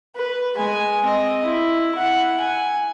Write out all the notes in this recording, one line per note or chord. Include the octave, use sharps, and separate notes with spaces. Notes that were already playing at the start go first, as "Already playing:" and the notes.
B4
G#3 G#5
C4 D#5
E4
E4 F#5
G#5